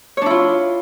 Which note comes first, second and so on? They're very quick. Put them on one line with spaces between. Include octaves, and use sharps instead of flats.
C#5 D4 E4 F4